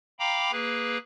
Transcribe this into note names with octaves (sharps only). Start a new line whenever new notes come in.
F5 G5 A#5 B5 D6
A#3 G#4 B4